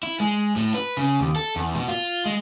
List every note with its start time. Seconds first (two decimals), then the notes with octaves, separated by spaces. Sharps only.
0.03 E4
0.20 G#3
0.56 A2
0.74 B4
0.97 C#3
1.20 D#2
1.36 A4
1.56 E2
1.75 B2
1.88 F4
2.26 G#3